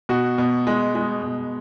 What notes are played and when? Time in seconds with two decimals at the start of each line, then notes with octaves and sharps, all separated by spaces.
0.09 B2 F#4
0.38 B2
0.67 G#3
0.95 G#3
1.23 B2